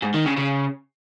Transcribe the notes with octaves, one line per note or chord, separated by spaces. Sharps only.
G#2
D#3
C#3
C#3